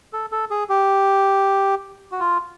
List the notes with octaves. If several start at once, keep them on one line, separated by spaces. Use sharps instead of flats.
A4
A4
G#4
G4
F#4
F4